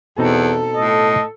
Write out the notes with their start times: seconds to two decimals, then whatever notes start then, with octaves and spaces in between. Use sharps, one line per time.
0.18 E2 B2 C4 D#4 A4
0.77 A2 D#5